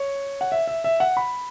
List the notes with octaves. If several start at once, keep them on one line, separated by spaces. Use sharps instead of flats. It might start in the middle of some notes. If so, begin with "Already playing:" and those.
Already playing: C#5
F#5
E5
E5
E5
F#5
B5